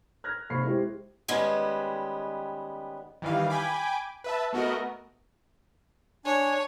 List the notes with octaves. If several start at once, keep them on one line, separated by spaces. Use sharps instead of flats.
F6 F#6 G#6 A#6
F1 A#3 C5 B5 C#6 C7
G#3 E4 G4 C5
D#3 G3 G#3 B3 C#4
D#3 E3 G3 F5
G5 G#5 B5 D6
B4 E5 A5
A3 B3 F#4 A#4 D#5
D4 C#5 G#5